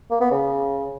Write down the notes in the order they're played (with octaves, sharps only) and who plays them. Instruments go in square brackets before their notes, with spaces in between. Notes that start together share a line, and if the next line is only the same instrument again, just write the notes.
[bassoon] A#3
B3
C#3